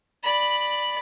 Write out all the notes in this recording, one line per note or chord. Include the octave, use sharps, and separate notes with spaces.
D5 B5